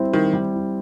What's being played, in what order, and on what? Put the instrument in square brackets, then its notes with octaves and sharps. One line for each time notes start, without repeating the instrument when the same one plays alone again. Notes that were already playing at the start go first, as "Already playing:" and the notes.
Already playing: [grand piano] G3 C4 E4
[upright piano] D#3 [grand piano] G3
[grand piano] G3
E4